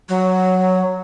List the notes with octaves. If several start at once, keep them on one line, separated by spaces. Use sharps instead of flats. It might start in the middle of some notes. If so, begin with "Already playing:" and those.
F#3